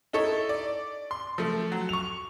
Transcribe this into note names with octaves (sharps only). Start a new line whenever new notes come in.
D#4 E4 A4 C#5
D5
C6
F3 A3
F#3
C#6 F7